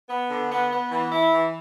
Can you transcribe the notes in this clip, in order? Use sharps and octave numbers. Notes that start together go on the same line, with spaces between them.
B3
D3
B3
B3
E3
E4
E3